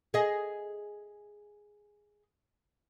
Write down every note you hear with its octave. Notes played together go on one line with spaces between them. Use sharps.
G#4 D#5